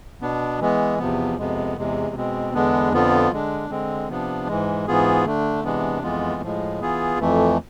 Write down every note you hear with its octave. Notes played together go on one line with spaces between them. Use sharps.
B2 B3 D4
E3 G#3 B3
E2 C3 F3 B3
F2 C3 G#3 B3
E2 C3 G#3
B2 G#3 C4
E2 D3 G#3 B3 D4
F2 D3 F3 B3 F4
D3 G#3 D4
D3 G#3 C4
C3 F3 B3 D4
G#2 E3 G#3
G#2 E3 B3 F4 G#4
D3 A3 D4
C3 E3 G#3 B3 D4
F2 E3 G#3 B3 F4
A2 F3 G#3
E3 B3 F4 G#4
F2 E3 A3